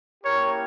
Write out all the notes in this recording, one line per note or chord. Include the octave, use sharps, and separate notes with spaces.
A#3 C#4 E4 G4 A#4 C#5